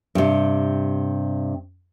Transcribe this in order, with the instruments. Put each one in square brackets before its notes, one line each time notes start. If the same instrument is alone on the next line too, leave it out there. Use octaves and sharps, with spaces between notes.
[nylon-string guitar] G2 C3